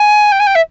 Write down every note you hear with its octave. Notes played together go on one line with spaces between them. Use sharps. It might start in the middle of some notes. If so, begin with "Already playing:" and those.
Already playing: G#5
G5
G#5
G5
E5